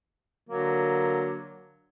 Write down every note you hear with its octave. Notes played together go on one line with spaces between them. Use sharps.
D3 F#3 A#3